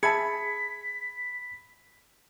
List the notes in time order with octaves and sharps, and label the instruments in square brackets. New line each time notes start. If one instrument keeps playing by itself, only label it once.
[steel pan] G#4 E5 A5 [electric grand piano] B5 G#6 C#7 [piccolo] B6